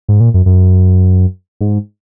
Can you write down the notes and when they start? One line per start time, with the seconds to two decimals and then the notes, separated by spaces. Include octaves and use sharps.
0.08 G#2
0.20 A#2
0.34 F#2
0.46 F#2
1.61 G#2